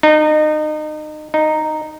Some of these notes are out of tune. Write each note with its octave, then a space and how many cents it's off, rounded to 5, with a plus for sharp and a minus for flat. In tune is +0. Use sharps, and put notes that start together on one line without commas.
D#4 -30
D#4 -10